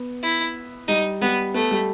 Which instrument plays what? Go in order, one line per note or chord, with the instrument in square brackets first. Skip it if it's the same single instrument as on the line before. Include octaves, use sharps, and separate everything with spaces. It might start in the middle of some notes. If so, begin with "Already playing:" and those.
Already playing: [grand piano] B3
[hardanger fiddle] E4
[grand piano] G3 [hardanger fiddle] D#4
[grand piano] G3 [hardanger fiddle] B3
[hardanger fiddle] A3 [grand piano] B3
[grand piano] G3